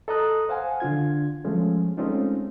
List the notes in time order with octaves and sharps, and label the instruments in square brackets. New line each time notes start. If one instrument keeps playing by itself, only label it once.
[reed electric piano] A4 D#5 A#5 D#6 F#6
C5 F5 F#5 G#5
D3 D4 F4 G#6
F3 G#3 A3 C#4
G#3 A3 C4 C#4 D#4 F4